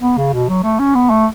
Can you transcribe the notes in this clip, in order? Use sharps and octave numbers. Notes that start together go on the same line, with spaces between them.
B3
C#3
B2
F#3
A3
C#4
B3
A3